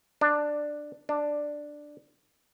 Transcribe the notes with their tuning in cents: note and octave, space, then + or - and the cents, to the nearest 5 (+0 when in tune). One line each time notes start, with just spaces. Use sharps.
D4 +10
D4 +5